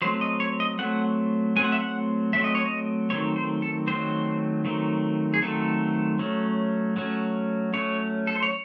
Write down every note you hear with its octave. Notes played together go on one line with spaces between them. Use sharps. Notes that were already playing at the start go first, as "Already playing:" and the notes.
F#3 A3 C4 C5
D#5
C#5
D#5
F#3 A3 C4 F#5
F#3 A3 C4 G#5
F#5
E5
F#5
F#3 A3 C4 E5
D#5
C#5
D#5
D#3 F#3 A3 C4 C#5
C5
A4
D#3 F#3 A3 C4 C5
D#3 F#3 A3 C4
G#4
D#3 F#3 A3 C4 A4
F#3 A3 C#4
F#3 A3 C#4
F#3 A3 C#4 C#5
A4
C5
C#5